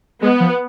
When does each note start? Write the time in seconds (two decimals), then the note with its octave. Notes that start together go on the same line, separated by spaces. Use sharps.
0.22 G#3 B3
0.40 F3